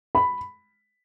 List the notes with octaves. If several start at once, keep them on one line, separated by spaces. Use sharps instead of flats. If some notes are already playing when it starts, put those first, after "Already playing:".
B5